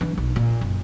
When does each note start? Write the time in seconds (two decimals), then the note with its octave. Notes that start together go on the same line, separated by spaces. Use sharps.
0.01 E3 D4
0.18 B1
0.36 A#2
0.61 F#1